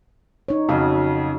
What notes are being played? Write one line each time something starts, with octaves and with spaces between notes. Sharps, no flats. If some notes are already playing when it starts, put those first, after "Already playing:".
D#4 C#5
F2 C#3 F#3 F#4 F5